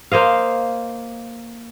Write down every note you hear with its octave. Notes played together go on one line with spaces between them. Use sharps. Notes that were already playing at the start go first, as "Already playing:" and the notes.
A#3 C5 D#5 F5